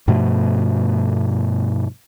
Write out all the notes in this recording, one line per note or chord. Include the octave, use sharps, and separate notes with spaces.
G2 B2 F3 A3